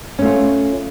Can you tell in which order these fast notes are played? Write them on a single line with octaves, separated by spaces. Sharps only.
C#4 A3 F4